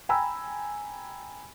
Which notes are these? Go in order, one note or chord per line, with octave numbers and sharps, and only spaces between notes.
G5 G#5 A#5 B5 E6